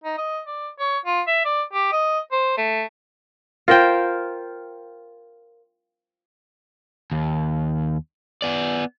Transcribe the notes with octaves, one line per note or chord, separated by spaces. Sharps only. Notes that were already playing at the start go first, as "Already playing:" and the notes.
D#4
D#5
D5
C#5
F4
E5
D5
G4
D#5
C5
A3
F4 A#4 C5 G5
D#2
B3 D5